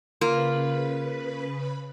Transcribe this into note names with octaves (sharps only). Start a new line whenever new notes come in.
C#3 A#3 F4 B4 B5